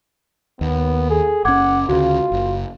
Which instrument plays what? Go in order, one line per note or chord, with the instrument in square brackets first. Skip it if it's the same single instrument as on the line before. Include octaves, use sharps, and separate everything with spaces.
[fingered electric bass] D#2 [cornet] B3
[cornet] G#4 [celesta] A4
[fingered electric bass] F#1 C#4 [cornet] F#5 [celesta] D6 G#6
[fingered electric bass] D2 C#3 [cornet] F4 [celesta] F#4
[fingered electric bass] F#1